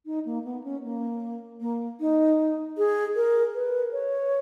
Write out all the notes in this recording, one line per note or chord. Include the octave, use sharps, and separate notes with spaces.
D#4
A#3
B3
C#4
A#3
A#3
D#4
G#4
A#4
B4
C#5